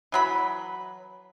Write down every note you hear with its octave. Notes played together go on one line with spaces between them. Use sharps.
E3 F#3 B5